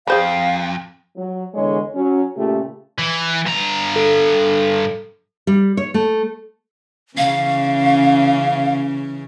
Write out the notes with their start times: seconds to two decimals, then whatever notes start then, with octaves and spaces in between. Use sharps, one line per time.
0.07 F2 G#4 C5 F5 B5
1.16 F#3
1.54 E2 D3 G#3 C#5
1.95 F#3 C#4
2.36 A#2 C#3 A3 G4
2.98 E3
3.46 G2 A#5
3.96 A4
5.47 G3
5.77 C#5
5.94 A3
7.17 C#3 E3 C#4 F5